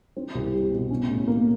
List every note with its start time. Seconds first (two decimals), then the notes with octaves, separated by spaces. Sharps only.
0.17 C4
0.35 C2
0.53 G3
0.72 B2
0.90 C#4
1.09 A2
1.28 A#3